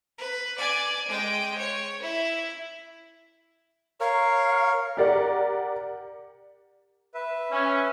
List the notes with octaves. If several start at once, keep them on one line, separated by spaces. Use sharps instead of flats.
B4
D5 G#5
G#3 G5
C#5
E4
A#4 C#5 F5
G4 A#4 D5 F#5
B4 E5
C#4